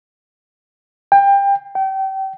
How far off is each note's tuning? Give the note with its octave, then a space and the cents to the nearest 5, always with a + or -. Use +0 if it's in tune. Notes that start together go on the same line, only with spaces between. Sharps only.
G5 +25
G5 -30